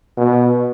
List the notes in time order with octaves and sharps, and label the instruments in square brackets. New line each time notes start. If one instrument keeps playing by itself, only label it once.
[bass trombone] B2